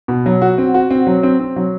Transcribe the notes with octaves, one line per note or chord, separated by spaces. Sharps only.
B2
F#3
F#4
C4
F#4
C4
F#3
C4
C4
F#3